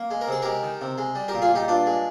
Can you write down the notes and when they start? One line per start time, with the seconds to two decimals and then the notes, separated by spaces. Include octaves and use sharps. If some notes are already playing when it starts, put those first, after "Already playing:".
Already playing: A#3
0.11 G#3
0.21 A#4
0.27 C3 G#4
0.42 G#3 G4 A#4
0.63 D#3
0.81 C3
0.98 G#3
1.15 G3
1.28 G4 A#4
1.34 A#2
1.42 F4 G#4
1.51 A#2 D#4 G4
1.68 G2 D4 F4
1.86 G#3